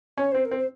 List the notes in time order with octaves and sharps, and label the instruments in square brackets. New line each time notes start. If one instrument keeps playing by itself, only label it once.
[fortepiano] C#4 [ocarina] C#5
[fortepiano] C4 [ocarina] C5
[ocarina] A#4
[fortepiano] C4
[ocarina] C5